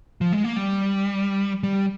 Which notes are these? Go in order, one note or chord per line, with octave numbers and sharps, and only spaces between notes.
F3
G#3
A#3
G3
G3